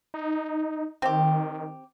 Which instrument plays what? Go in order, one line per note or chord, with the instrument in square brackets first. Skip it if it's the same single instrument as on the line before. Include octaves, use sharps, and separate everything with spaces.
[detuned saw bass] D#4
[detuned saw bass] D#3 [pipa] C4 G4